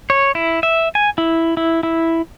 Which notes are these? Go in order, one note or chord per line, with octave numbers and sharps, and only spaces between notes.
C#5
E4
E5
G#5
E4
E4
E4